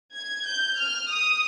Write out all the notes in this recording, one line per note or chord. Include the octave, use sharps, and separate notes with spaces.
G#6
G6
F6
D#6